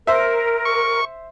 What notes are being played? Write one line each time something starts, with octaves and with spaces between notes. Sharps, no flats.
A#4 C5 E5
C#6